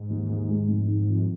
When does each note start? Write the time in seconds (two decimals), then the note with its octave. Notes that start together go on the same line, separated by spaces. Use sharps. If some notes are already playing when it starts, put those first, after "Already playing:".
Already playing: G#2
0.10 D#2
0.29 D#2
0.49 G#3
0.68 F1
0.87 D#3
1.07 F2